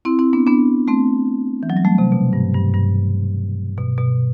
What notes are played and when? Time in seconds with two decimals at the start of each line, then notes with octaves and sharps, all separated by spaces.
0.05 C4 E4
0.19 C4 E4
0.33 B3 D4
0.47 B3 D4
0.88 A3 C4
1.63 E3
1.70 F#3
1.77 G3
1.85 F#3 A3
1.98 C3
2.12 B2
2.33 G2
2.54 G2
2.74 G2
3.78 B2
3.98 B2